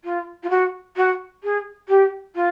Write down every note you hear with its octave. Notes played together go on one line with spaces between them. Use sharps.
F4
F4
F#4
F#4
G#4
G4
F4